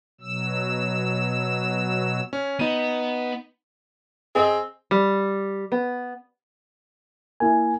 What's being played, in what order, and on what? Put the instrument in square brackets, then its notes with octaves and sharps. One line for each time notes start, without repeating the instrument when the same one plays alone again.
[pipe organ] B2 F#3 E6
[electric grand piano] C#4
[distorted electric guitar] B3 [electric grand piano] D#4 D#7
[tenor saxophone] C4 [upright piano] G#4 D#5
[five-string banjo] G3
B3
[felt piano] A#3 E4 [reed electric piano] G#5